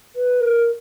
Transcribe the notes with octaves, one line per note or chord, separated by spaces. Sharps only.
B4
A#4